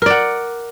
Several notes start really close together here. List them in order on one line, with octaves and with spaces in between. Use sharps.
A#4 D5 F#5